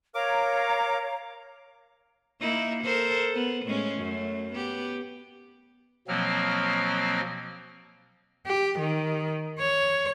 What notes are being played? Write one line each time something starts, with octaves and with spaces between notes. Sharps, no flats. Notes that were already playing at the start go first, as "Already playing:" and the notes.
A#4 C#5 F5 A#5 D6
A#3 D#4 E4
A4 A#4 C5
B3
A2 G#3 C#4
F#2 A3
B3 G4
B2 F3 F#3 A#3 C4 F6
G4
D#3
C#5